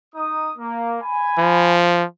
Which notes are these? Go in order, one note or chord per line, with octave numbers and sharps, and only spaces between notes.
D#4 D#6
A#3
G#5 B5
F3